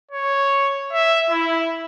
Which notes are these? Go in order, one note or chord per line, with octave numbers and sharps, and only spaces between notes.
C#5
E5
E4